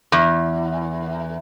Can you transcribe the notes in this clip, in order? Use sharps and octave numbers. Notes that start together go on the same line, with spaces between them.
E2